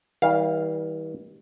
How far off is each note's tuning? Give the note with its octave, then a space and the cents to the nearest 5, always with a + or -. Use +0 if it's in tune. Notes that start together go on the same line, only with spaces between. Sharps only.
E3 -45 G3 +0 F5 +0